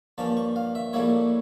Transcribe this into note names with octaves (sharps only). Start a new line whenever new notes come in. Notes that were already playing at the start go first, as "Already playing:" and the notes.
G2 F3 A#3 C#4 A5
C#6
F5
E5
A#1 A2 G3 A#3 E4 C#5